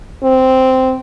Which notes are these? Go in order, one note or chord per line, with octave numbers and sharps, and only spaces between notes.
C4